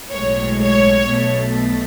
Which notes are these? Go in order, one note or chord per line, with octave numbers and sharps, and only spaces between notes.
B1 A2 G#3 C#5
C#5
B1 B2 A3